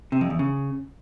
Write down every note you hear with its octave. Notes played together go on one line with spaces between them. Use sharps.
C3
F2
E2
C#3